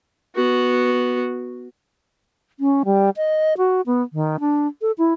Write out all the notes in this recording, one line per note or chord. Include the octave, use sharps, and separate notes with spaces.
B3 F#4
C#4
G3
D#5
F#4
B3
D#3
D4
A4
E4